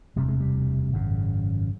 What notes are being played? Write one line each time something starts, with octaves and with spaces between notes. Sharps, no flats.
E1 D2 C3 G3
G#3
G3
G#1 F#2 C#3